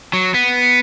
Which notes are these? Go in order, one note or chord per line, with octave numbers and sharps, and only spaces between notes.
F#3
B3